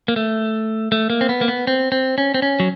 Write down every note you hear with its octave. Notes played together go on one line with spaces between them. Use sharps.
A#3
A3
A3
A#3
C4
B3
A#3
B3
C4
C4
C#4
C4
C#4
F#3